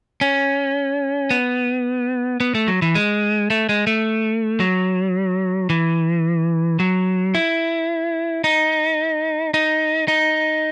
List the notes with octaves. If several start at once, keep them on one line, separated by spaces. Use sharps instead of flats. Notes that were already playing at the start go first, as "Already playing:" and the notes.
C#4
B3
B3
A3
F#3
E3
G#3
A3
G#3
A3
F#3
E3
F#3
E4
D#4
D#4
D#4